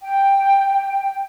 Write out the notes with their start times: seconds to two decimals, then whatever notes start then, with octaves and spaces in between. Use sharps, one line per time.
0.02 G5